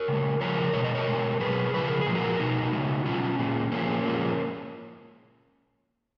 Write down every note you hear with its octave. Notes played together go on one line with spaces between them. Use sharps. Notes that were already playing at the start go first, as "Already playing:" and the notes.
Already playing: A#4 C#5
C#3 G#3
C#3 F3 A#4 C#5
B2 G#3 C#5
D#5
A#4 C#5
B2 G#3
B2 F#3 G#4 B4
C#3 F3 G#3 B4
A#4
G#4
A#2 F3 G#3
F#4 A#4
B2 G#3 D#4 F#4
C#3 G#3
B2 F#3 C#4 F4
A#2 G#3
A#2 F3 G#3 A#3 C#4
A#2 F3 G#3